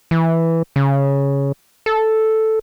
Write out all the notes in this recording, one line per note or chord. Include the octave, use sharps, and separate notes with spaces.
E3
C#3
A4